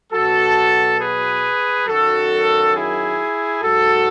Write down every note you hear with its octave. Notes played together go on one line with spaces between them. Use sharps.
B2 F#3 F#4 A4
G#4 B4
F#2 D#3 F#3 F#4 A4
E4 G#4
G#2 F#3 F#4 A4